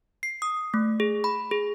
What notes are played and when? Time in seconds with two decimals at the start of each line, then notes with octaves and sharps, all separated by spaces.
0.23 C7
0.42 D#6
0.74 A3
1.00 G#4
1.24 B5
1.51 G#4